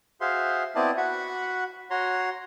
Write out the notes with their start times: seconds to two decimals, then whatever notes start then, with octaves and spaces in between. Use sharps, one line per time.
0.21 F#4 G#4 C5 E5 F5 C6
0.75 B3 C4 E4 D5 D#5 A5
0.97 F#4 F#5 B5 C#6
1.90 F#4 C#5 A#5 C6